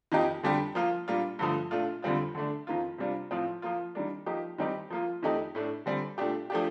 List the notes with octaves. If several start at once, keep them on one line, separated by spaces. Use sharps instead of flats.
F2 D#3 A#3 D#4 G4
F2 D3 G3 D4 G4
F3 A#3 F4
A#2 G3 A#3 D4 F4
G2 D3 F3 A3
A#2 A3 D4 F4
F2 D3 G3 C4 F4
D3 A3 D4
F2 D#3 A#3 F4
C3 G3 D4 F4
A2 F3 C4 F4
F3 A#3 F4
D#3 G3 A#3 D4
F3 A#3 D#4 G4
D#3 G3 C4 D#4 G4
F3 A#3 F4
F2 D#3 A3 D#4 G4
A2 A3 D4
D3 G3 C4
A#2 A3 D4 G4
F3 A3 D4 G4